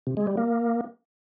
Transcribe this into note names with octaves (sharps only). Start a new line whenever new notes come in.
C3
G#3
G3
A#3